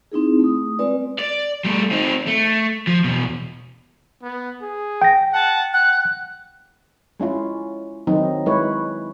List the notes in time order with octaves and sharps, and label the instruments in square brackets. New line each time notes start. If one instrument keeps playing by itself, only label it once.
[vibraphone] C4 D#4 E4 G#4
A3 D#6
G#3 C4 F4 B4 D5
[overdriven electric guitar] D5
G3 A3
C4 D#4
A3
F3
E2 B2
[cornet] B3
G#4
[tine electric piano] G5 A#6
[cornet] F#5 [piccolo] A5
[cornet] F#5 [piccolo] F#6
[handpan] G#3 C#4 E4 F4
D#3 F#3 C4 D#4
G#3 E4 B4 C#5